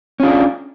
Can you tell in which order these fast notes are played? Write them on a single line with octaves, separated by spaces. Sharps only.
C#4 F4 D4